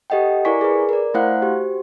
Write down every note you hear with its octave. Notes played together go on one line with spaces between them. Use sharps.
G4 A4 D#5 F#5 G5
E4 A#4 D5 G#5 C#6 B6
G#4 B4
A#4 D5
A3 E4 C5 F5 F#5 F#6
F#4 G4 C5